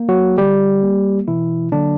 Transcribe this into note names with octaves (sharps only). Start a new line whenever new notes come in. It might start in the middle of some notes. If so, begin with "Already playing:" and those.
Already playing: A#3
F#3 F#4
D3 G3 G4
A#3
B2 E3 E4
D3 F#3 A#3 D4